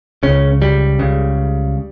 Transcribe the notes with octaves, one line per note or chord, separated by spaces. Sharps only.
C#2 C#3 C#4
G3
C#2 C#3